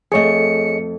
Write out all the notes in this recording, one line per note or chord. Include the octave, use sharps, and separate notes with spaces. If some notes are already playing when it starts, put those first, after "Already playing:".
F2 A3 G#4 C#5 D#5 C#7